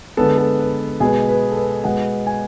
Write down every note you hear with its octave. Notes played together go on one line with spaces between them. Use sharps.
D3 G#3 B3 A4
A4
B4
B2 G#3 B3 G#4
B4
A4
B4
B2 G#3 B3 F#5
G#5